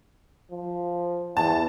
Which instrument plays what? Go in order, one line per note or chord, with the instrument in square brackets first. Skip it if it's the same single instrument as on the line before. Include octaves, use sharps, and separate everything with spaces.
[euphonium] F3
[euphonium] E2 [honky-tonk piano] A5